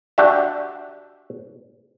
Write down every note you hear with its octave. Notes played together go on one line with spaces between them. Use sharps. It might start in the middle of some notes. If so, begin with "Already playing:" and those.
D4 F#4 G4 D5 E5